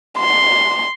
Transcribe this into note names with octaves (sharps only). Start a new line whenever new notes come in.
C6